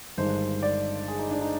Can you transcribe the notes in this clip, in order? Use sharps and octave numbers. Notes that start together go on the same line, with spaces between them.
G1 G2 D#3 G#3 C5
D5
G#4
D#4
D4
D#4